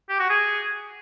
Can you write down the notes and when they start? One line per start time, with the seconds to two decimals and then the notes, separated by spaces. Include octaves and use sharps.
0.09 G4
0.19 F#4
0.30 G#4